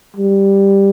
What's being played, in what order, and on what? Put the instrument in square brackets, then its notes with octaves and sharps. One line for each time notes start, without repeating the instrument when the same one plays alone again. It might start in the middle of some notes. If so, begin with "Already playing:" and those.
[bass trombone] G3